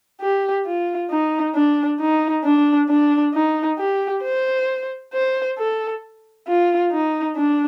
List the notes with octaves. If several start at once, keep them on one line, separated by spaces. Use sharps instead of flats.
G4
F4
D#4
D4
D#4
D4
D4
D#4
G4
C5
C5
A4
F4
D#4
D4